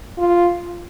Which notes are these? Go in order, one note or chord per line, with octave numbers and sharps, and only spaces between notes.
F4